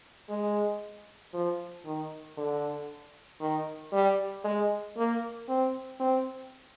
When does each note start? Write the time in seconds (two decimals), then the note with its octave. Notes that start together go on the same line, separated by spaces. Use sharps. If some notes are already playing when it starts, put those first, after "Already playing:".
0.29 G#3
1.34 F3
1.85 D#3
2.37 D3
3.41 D#3
3.93 G3
4.44 G#3
4.97 A#3
5.48 C4
6.00 C4